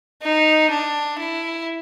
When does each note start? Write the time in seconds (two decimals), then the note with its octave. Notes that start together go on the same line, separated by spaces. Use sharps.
0.23 D#4
0.71 D4
1.19 E4